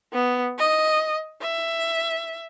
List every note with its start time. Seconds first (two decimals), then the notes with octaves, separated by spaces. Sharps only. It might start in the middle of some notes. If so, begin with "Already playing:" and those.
0.13 B3
0.58 D#5
1.42 E5